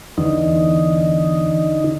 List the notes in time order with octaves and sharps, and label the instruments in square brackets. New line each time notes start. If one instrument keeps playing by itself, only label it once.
[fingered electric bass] E2 [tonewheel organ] D3 D#4